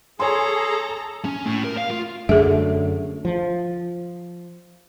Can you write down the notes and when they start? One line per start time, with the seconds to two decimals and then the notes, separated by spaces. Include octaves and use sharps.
0.20 G#4 A4 C#5 G#5 A#5 C6
1.25 C#4
1.46 A2
1.64 A#4
1.77 F5
1.91 F4
2.29 F#2 D3 A3 G#4 E5
3.25 F3